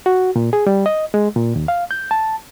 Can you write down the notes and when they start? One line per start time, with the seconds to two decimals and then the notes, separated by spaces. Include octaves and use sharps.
0.06 F#4
0.36 A#2
0.53 G#4
0.67 G3
0.86 D#5
1.14 G#3
1.36 A#2
1.56 D#2
1.68 F5
1.91 G6
2.11 A5